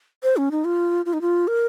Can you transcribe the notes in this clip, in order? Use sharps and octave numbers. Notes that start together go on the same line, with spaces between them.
C5
C#4
D#4
F4
F4
D#4
F4
A#4